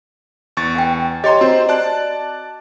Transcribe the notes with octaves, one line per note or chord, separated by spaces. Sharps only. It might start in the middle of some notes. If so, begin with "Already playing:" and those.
E2 C#6 A6
F#5 G5
G4 C#5 D#5 A#5 C6
C4 F#4 C5
D5 A5 F#6